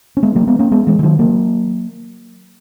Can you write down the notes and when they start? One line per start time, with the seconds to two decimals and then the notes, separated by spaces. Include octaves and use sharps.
0.17 C#4
0.23 G#3 B3
0.35 F#3 A#3
0.47 G#3 B3
0.59 A#3 C#4
0.72 G#3 B3
0.87 E3 G#3
0.99 E3
1.03 D#3 F#3
1.19 F#3 A#3